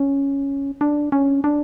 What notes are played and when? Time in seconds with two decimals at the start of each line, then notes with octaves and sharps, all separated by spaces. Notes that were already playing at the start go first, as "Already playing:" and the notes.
Already playing: C#4
0.81 D4
1.12 C#4
1.44 D4